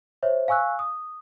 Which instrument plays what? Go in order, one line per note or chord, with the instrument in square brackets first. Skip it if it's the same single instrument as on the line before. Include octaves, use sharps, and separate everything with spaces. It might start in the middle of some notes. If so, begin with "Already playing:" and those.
[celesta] C5 C#5 E5
F5 G#5 C#6 E6 F#6
D#6